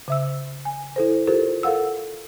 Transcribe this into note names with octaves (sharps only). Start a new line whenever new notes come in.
C#3 E5 E6
G#5
E4 A4 C5
F4 G4 A4 A#4 C5
A4 A#4 F5 F#5 E6